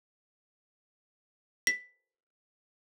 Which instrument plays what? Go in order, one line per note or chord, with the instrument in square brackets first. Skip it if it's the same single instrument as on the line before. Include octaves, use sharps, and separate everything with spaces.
[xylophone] B6